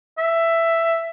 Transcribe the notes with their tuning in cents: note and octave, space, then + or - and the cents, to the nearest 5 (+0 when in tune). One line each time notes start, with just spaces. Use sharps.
E5 +10